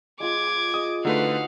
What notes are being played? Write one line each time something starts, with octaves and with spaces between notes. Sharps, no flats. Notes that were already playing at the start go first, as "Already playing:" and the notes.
G#3 F4 G#4 D6 G#6
G#4 D#5 D#6
D3 A3 D#4 F#4 B4 C5 F5 F#5